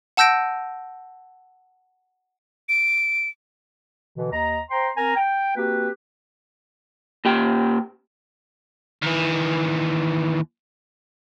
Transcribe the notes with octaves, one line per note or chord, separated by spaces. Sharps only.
F#5 A5 E6 G6 A#6 D7
D7
B2 D3 E3
D#2 D#5 A#5
C5 G5 A#5 C6
C4 A#4 G#5 A#5
G5
A#3 C4 F#4 G4 B4
A#2 G4 G5
D#2 E3